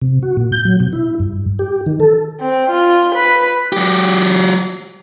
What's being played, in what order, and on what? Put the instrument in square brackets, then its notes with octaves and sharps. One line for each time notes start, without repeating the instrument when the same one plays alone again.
[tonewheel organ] C3
F#4
A#2
G6
F#3
B2
E4
G2
G4
D#3
A4
[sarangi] C4
F4
B4
[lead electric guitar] F#3 G4